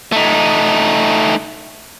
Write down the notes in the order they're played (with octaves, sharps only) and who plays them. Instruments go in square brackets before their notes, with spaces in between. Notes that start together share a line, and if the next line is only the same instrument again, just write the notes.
[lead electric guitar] A3 D#4